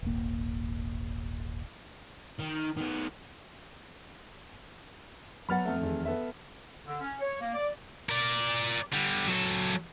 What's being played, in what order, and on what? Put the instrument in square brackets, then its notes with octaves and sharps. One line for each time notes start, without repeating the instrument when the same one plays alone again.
[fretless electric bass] D#1 G#1 A#3
[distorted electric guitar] D#3
D#3 B3
[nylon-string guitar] F#3 B3 F#5 [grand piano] B5 F6 A6
[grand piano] F2 A3
[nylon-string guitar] E2 D#3
[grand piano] B3 A4 E5
[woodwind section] D3
C#4
C#5
A#3
D5
[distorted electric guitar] A#4 D5
D3 G3
F#3 A4